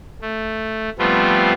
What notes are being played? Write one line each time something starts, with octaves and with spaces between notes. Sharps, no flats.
A3
F3 G3 A3 B3 C4 F4